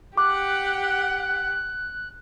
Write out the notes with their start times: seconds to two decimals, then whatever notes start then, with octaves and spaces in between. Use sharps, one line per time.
0.18 G4 F#5 D6 F#6